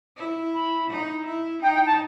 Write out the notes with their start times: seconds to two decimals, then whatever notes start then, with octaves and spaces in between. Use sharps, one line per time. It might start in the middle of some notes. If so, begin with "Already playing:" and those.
0.17 E4
0.54 B5
0.90 D#4
1.26 E4
1.62 D#4 G5
1.74 G5
1.86 A5